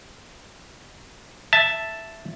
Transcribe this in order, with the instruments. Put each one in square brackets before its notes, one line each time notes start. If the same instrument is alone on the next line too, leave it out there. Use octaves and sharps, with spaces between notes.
[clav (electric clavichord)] E5 A5